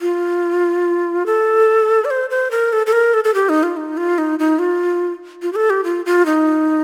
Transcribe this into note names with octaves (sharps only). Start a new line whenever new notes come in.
F4
A4
D5
C5
C5
A#4
A4
A4
A#4
A4
A4
G4
D#4
F4
D#4
F4
D#4
D#4
F4
F4
G4
A4
G4
F4
F4
D#4